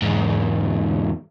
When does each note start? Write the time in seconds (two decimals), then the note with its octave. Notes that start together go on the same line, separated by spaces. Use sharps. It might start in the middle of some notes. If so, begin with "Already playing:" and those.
0.02 E2 G#2